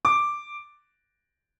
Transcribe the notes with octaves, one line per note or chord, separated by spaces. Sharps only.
D6